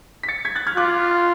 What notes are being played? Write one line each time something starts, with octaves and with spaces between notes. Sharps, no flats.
B6
A6 C#7
G#6 B6
F#6 A6
F6 G#6
F4 D6 F#6